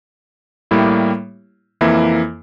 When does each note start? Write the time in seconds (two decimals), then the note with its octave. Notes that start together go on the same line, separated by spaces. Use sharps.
0.71 A2 G3 A#3 E4 G4
1.81 F2 E3 A#3 E4